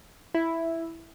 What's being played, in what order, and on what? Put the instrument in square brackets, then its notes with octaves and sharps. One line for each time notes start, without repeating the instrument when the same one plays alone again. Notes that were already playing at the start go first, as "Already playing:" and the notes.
[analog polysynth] E4